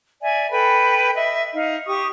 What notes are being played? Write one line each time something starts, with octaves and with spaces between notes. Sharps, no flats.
D5 E5 G#5
A4 B4 G5 B5
D#5 E5
D#4 F5
G4 C#6 D#6